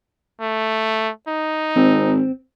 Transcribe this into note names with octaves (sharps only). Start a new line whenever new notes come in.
A3
D#4
G#1 C4